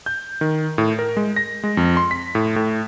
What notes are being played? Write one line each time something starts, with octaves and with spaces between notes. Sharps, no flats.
G6
D#3
A2
A#4
G#3
A#6
G#3
F2
C6
B6
A2
A2